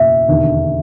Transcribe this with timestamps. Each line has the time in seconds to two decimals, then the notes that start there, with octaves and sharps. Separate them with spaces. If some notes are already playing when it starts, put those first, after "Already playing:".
Already playing: F#1 E2 B2 A#3 E5
0.28 E1 D#2 D3